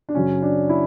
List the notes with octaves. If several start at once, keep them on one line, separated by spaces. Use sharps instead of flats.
D4
F#2 C#3 F#3 C#4
D4
E4